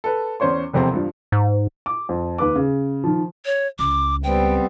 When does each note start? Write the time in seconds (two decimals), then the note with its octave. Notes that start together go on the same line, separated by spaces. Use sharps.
0.04 A4 B4
0.40 E2 C#4 C5 C#5 C6
0.73 E1 F2 C3 C4 C6
0.94 G2 F3
1.32 G#2
1.86 D6
2.09 F2
2.38 D#2 B4 D6
2.55 C#3
3.04 D#3 F3
3.45 C#5
3.79 C#2 D6
4.24 G3 B3 C4 G5